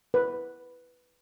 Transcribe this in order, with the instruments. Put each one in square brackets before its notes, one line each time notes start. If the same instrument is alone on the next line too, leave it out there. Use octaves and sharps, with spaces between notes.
[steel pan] B4